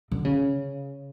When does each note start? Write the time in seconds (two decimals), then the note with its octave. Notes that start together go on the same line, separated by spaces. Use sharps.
0.12 D3
0.25 C#3